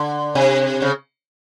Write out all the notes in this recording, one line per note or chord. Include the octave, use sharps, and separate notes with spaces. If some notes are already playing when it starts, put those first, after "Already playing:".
Already playing: D3
C3
C#3